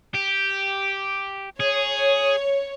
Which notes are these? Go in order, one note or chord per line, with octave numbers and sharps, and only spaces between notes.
G4
G#4 C#5